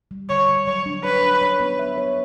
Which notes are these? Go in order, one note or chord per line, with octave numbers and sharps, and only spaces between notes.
G3
D3 C#5
D3
F#3 C#5
D4
B4 C#5
D4
C#5
B3
E5
C#5